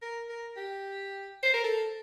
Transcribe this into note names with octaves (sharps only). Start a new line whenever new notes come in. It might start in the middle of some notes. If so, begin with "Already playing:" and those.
A#4
A#4
G4
C5
A#4
A4